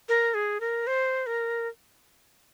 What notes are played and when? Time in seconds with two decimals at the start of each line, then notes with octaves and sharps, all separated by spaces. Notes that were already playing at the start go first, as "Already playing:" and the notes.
0.09 A#4
0.34 G#4
0.60 A#4
0.87 C5
1.26 A#4